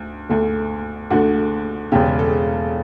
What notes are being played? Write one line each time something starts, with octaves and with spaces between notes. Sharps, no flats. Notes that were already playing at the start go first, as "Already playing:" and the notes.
Already playing: D2
D2 D3 A3
D2 D3 A3 F#4
E1 E2 C#3 G4
A4